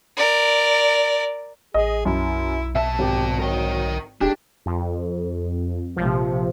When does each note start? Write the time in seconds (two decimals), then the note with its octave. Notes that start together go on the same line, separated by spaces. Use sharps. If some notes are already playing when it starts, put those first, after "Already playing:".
0.16 A#4 D5
1.74 A1 G#4 D#5
2.05 B1 F#2 E4
2.75 B2 E5 A5
2.99 G#1 G4
3.39 F#3 A#4 G5
4.21 D#1 G#3 D4 G4
4.66 F2
5.96 A#1 C3 F3